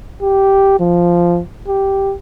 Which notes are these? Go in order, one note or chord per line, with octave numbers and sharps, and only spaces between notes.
G4
F3
G4